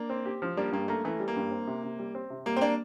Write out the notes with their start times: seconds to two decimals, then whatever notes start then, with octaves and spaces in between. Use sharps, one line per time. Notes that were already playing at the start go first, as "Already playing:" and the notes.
Already playing: A#3 D4
0.10 C4
0.26 G4
0.42 F3
0.57 G3 A#3 D4
0.72 G2 A#3
0.88 A3 A#3
1.05 E3 A3
1.20 G3
1.28 A#3
1.36 G2
1.51 C4
1.67 C3
1.84 C3
1.99 G3
2.15 C4
2.30 C3
2.46 G3 A#3
2.56 C4
2.61 A#3 D4